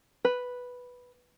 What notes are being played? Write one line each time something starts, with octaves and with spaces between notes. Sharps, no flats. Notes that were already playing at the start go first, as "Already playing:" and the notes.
B4